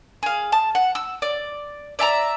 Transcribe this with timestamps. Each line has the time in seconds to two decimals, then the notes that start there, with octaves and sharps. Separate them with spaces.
0.23 G#4 F5
0.52 A5
0.75 F#5
0.95 E6
1.22 D5
1.99 D5 E5 A5 A#5